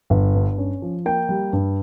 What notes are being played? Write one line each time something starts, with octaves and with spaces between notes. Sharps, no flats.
G1
G2
C#4
F3
A#3 G5
G3
G2